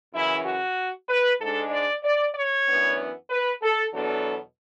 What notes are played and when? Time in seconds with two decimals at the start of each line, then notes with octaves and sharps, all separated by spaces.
0.14 F#2 C#3 E3 E4
0.46 F#4
1.09 B4
1.40 G#2 G#3 D4 A4
1.71 D5
2.03 D5
2.35 C#5
2.67 F#2 E3 B3 D4
3.30 B4
3.62 A4
3.93 E2 B2 F#3 B3 D4 A4